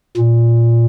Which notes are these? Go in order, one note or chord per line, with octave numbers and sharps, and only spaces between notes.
A#2